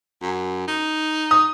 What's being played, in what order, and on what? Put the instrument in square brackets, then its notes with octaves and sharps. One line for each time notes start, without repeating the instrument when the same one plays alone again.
[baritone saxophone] F#2
D#4
[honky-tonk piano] D#6